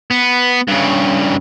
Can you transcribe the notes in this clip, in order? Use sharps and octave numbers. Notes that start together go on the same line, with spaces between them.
B3
G2 C#3